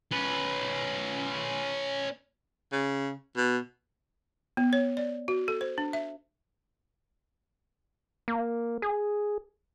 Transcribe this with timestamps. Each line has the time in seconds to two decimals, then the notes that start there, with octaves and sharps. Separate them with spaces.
0.11 C#4 B4
2.72 C#3
3.36 B2
4.57 B3
4.73 C#5
4.97 D5
5.28 F#4
5.48 A4
5.61 C5
5.78 D4
5.93 E5
8.28 A#3
8.82 G#4